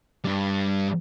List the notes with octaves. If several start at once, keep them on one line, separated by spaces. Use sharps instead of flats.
G2 G3